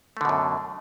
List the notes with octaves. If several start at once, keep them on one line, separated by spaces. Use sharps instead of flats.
F#2 B2 D3 A3